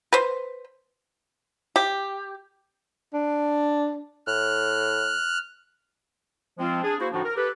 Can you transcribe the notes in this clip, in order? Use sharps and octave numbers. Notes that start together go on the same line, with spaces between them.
B4 C5
G4
D4
A2 F6 F#6
F3 G#3 C4 F4
D4 G#4
A#3 E4 F#4 C5
A2 D3 F3 D4 D#4 F#4
A#4
G4 A4 B4